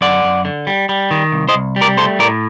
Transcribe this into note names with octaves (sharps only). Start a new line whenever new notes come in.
F#2 D5 F#5
F#2
D3
G3
G3
D#3
C2
C5 D#5
C2
G3
A#4 D5
A3 A4 C5
A2 A#4 D5